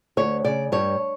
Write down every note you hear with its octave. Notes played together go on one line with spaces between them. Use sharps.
D2 C#5
C#3 D5
G2 C#5